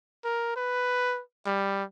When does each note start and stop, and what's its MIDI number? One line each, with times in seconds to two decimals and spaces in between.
0.25 0.53 70
0.56 1.21 71
1.46 1.83 55